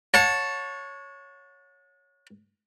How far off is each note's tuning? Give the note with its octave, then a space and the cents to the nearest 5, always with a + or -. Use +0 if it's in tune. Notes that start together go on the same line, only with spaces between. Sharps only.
C#5 +0 F#5 -40 A5 +0